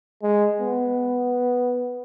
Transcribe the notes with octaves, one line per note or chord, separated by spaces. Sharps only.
G#3
B3